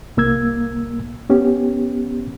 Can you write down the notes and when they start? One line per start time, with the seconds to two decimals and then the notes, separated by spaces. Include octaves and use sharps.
0.17 C2 A#3 E6 G#6
1.30 B3 C#4 G4